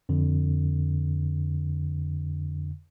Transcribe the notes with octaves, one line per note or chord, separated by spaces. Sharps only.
F2 D3